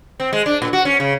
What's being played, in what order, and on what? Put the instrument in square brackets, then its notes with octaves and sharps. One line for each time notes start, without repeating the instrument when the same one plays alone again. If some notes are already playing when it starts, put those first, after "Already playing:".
[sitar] C4
G#3
D4
A#2
F#4
C#4
C#3